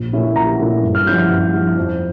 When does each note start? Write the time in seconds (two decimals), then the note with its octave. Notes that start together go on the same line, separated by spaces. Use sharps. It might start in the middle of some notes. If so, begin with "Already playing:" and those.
Already playing: A#1
0.13 A#2 A3 C#4 E4
0.36 A#1 A#5
0.59 A#2 A3 C#4 E4
0.83 G2
0.95 F6
1.07 F3 C#4 E4 G6
1.18 F6
1.30 G2
1.54 F3 C#4 E4
1.77 F2